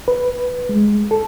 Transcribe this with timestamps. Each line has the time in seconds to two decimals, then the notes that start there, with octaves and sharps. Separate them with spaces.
0.08 B4
0.69 G#3
1.11 A4